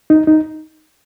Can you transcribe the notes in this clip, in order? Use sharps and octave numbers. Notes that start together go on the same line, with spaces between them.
D#4
D#4